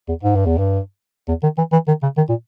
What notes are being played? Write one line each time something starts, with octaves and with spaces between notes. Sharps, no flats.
E2
G#2
G2
E2
G2
E2
D#3
E3
E3
D#3
C#3
D#3
A#2